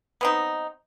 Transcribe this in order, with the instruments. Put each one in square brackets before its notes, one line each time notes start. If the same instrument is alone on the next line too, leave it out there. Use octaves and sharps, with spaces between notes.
[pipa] B3 C4 D#4